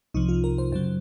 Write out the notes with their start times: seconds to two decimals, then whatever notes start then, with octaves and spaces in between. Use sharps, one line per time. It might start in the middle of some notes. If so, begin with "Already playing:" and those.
0.14 C2 C3 F3 D#4
0.29 F4
0.44 A#4
0.58 C5
0.72 F#2 C#3 F#3 C5